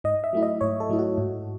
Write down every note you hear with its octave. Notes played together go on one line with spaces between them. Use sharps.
G#2 D#5
E5
F#3 A3 E4
D#5
G#2 C#5
A4
F#3 A3 E4
F#4
G#2